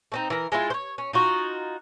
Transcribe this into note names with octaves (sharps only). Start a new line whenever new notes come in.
A3 C4 D#4
E3 A#4
G#3 E4 F4
C5 C#5
C#4
D#4 F4 F#4